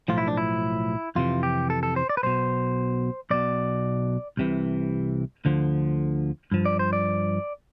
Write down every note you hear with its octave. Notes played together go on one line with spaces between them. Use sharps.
B1 A2 F3 F4
E4
D4
E4
F2 C3 E3 F4
G4
A4
A4
C5
D5
B4
B1 B2 C5
B1 B2 D5
C2 C3 E3
D2 D3 F3
G2 F3
D5
C5
D5